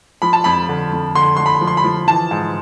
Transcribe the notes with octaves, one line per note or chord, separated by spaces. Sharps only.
F3 B5
A5
F2 B5
D3
F2
D3 C6
D3 C6
B5
F3
C6
B5
F3
E3 A5
G#2